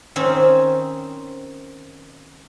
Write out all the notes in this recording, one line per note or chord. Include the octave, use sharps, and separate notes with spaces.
D#3 C4 C#4